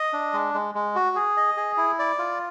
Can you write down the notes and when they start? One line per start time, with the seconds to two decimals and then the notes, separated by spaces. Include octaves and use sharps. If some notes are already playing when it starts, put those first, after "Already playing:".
Already playing: D#5
0.13 D4
0.34 G#3
0.54 G#3
0.75 G#3
0.95 F#4
1.16 G#4
1.37 D#5
1.57 G#4
1.77 E4
1.99 D5
2.19 F4